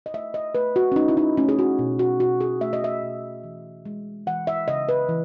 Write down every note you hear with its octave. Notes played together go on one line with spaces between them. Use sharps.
D#5
A3 E5
D#5
A3 B4
F#4
C#4
A3 D#4
E4
D#4
A3 C#4
G#4
F#4
B2
F#4
B2 F#4
G#4
A3 E5
D#5
E5
B2
E3
G#3
E3 F#5
E5
C#3 D#5
B4
E3